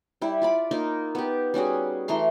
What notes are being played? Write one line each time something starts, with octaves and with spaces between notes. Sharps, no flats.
G3 E4
F4 D5 B5
A#3 D#4 F4 A#4
B3 G4
G3 C#4 F#4 G#4
E3 A3 A#5 C6